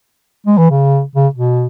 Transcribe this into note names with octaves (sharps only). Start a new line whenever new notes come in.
G#3
E3
C#3
C#3
B2